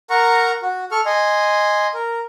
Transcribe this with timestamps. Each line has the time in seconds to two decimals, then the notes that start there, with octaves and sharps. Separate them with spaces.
0.10 A#4 F#5 A#5 C#6
0.62 F#4
0.91 A4 C#6 F6
1.06 D#5 G#5 C6
1.94 A#4